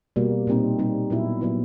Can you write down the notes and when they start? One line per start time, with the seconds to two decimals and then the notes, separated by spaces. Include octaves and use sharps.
0.16 B2 G3 A#3
0.47 A#2 G3 C4 D#4
0.79 A#2 G3 C4 D#4
1.10 A#2 F#3 B3 E4
1.41 A#2 F#3 B3 E4